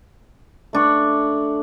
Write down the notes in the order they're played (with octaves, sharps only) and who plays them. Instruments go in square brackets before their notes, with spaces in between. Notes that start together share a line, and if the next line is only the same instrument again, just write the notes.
[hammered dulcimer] A3 D4 C#6